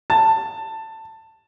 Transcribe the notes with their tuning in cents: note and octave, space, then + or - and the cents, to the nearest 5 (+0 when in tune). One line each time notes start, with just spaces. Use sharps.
A5 +15